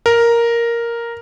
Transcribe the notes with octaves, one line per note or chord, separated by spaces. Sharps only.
A#4